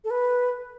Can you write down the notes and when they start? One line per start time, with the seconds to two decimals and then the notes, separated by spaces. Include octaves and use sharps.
0.04 A4
0.10 B4